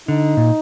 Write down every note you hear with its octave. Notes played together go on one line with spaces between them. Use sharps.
D3 D#4
A#2